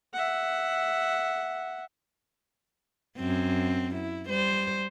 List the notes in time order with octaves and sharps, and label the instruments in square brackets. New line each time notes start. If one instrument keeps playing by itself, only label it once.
[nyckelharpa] E5 F#5
[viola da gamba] F#2 C4
E4
G3 C5